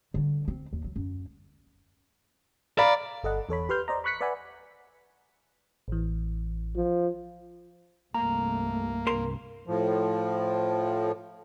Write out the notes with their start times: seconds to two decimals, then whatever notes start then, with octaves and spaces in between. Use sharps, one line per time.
0.14 D3 G3
0.48 C4
0.73 D#2
0.84 F#3
0.96 F#2
2.79 D5 F5 A#5 B5
3.23 G1 A4 D#5 F#5
3.49 E2 A4 C#5 B5
3.69 G4 B4 C6 F6 G6
3.88 C5 D5 D#5 A#5
4.04 B5 C#6 F#6 B6 C#7
4.21 B4 D5 E5 F#5 G#5 B5
5.88 A1 E3
6.76 F3
8.14 C2 G2 A3 A#3 A#5
9.07 C2 G2 A#4 C6
9.67 A2 F3